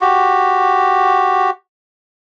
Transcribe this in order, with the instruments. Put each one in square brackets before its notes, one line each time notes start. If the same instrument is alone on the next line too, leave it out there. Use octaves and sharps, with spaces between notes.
[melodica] F#4 G4